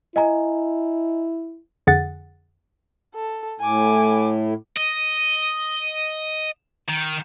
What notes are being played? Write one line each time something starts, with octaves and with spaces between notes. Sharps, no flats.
E4 D#5 G#5 A#5
F2 D3 G#4 F#5 A6
A4
A2 G#5 D6
D#5
D#3